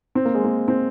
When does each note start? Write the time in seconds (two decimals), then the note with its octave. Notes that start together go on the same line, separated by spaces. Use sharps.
0.15 C4
0.25 A#3
0.35 G#3
0.44 A#3
0.68 C4